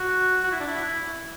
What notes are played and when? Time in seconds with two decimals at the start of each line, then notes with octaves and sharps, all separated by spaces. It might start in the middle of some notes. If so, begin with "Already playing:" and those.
Already playing: F#4
0.44 F#4
0.52 E4
0.60 D4
0.67 E4